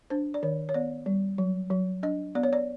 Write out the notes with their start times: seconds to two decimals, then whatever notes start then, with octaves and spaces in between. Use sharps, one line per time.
0.10 D4 C5
0.34 D5
0.43 D#3 C#5
0.69 C#5
0.74 B3 D5
1.06 G3
1.38 F#3
1.70 F#3
2.03 D4 D#5
2.35 B3 D5
2.43 C#5
2.53 D5